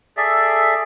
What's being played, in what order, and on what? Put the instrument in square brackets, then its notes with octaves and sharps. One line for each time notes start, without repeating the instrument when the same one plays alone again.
[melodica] G#4 A4 D5 E5